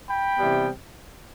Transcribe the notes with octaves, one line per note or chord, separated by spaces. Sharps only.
G5 B5
C3 E3 G3 B3